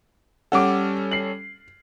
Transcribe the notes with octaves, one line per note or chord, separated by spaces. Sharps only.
G3 C#4 A4 F#5 D6
C7 F#7